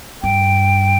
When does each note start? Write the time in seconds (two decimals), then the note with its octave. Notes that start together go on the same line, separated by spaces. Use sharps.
0.23 G2 G5